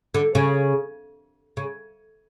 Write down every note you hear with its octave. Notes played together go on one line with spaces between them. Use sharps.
D3
C#3
C#3